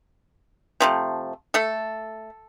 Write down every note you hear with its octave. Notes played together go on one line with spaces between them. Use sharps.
C3 F3 A3
A3 A4